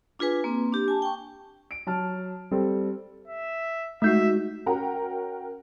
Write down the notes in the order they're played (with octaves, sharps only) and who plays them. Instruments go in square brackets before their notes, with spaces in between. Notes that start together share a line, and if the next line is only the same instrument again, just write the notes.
[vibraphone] D4 F4 G#4 B4 G#5
A#3 C4
D4 G4
G#5 A5
G5 C#6
[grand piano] D7
F#3 A5 F6
G3 C4 A4
[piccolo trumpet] E5
[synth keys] G#3 D#4 F#4 [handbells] A3 G6 C7 [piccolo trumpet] E5
[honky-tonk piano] C#4 F#4 A#4 F#5 G5 A#5